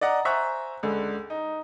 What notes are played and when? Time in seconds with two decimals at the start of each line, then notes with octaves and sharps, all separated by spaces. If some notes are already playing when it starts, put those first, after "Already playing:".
0.01 D5 D#5 F#5 A#5
0.25 C5 E5 G#5 A#5 C#6 F#6
0.83 C#2 D3
1.30 D#4